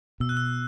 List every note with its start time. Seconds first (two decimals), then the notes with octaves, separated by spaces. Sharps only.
0.20 B2 E6
0.29 F#6
0.37 E6